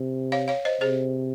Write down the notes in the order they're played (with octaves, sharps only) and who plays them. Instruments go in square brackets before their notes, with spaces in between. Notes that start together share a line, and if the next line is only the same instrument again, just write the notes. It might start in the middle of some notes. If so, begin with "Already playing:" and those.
Already playing: [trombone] C3
[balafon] C#5 F5
C#5 F5
C5 D#5
[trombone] C3 [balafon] G#4 C5